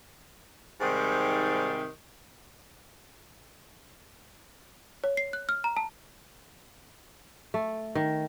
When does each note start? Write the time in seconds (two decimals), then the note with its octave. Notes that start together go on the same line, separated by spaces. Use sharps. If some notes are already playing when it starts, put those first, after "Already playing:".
0.81 G#2 C3 D#3 G3
5.04 C#5
5.17 C7
5.33 F#6
5.49 F6
5.64 A#5
5.77 A5
7.54 A3
7.95 D#3